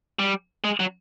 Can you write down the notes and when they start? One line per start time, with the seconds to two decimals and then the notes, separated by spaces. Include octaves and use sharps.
0.19 G3
0.64 G#3
0.80 F#3